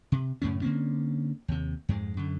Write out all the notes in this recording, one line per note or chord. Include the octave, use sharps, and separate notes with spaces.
C3
F#2 A2 C#3 C#4
D3 A#3 C4 C#4
D#2 C3
F2 G#2 G#3
F#2 D3